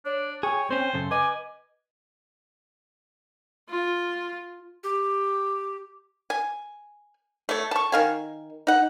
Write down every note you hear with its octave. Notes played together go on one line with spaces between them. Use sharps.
D4 C#5
G#4 C#5 G5
C4 C#4 C5
F#2 C#3 A4
B4 D#5 G#5 D6
F4
G4
G#5
A3 C#5
A5 C#6
D#3 F5 G#5
D#4 F#5